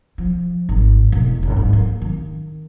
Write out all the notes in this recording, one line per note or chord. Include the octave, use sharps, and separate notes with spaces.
F3
G#1
E1
G1
G#2
A#3
D#3